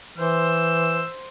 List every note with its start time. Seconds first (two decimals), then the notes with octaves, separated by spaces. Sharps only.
0.18 E3 C5 E6